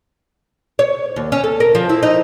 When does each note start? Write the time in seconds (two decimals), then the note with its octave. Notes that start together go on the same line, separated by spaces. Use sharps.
0.79 C#5
1.16 D#2
1.32 C#4
1.44 A4
1.60 A#4
1.75 F3
1.89 E4
2.03 D#4